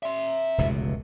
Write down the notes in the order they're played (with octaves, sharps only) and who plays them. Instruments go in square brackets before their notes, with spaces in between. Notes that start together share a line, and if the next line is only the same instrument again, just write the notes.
[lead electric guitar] E5 C6
[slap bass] F1 C#2 B2